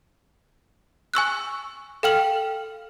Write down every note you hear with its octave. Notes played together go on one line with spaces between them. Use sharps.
G#5 C#6 E6 F#6
A4 F5 G5 F6 F#7